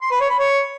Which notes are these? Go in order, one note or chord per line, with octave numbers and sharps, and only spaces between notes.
C6
B4
C#5
B5
C#5